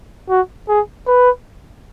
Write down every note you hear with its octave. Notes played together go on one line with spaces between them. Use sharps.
F#4
G#4
B4